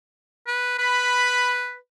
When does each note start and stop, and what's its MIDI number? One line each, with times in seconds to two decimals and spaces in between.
0.47 0.77 71
0.78 1.76 71
0.78 1.54 83